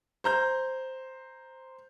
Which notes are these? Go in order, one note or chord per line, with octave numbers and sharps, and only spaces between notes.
C5 A#5 G6